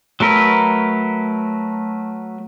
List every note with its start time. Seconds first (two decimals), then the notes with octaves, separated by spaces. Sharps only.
0.20 F#3 A3 A#4 B4